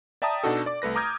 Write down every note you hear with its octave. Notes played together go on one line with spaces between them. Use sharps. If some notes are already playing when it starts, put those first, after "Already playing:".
D5 E5 G5 A5 A#5 D#6
B2 D4 D#4 F#4 A4
D5 D6
C2 A3 B4 A#6
A#5 D6 D#6 F6 G6 G#6